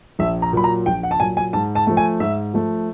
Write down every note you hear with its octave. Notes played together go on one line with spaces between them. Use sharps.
A#1 E5
A#5
A#2 F#3 B5
A#5
A#1 G5
F#5
A5
A#2 F#3 G#5
G#5
G#2 A5
A5
F3 A3
G#5
G#2 E5
F3 A3